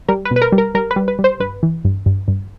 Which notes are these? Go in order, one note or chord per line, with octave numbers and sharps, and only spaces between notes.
G3 A#4
B4
B2
B4
A#4
G3
A#4
G3 A#4
B4
G3
B4
G3
C5
G2 B4
E3
G2
G2
G2